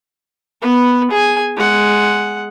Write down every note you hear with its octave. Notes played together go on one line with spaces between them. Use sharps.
B3 B4
G#4 G#5
G#3 F#5